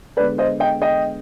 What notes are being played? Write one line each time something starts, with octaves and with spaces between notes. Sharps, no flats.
D3 G#3 B3 B4 D5
C5 D#5
D#5 G5
D#5 G5